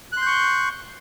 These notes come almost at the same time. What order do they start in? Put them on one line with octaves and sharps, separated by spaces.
F#6 C6 G6 C#6